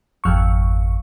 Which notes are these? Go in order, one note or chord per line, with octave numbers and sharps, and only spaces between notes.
G#1 F2 C#6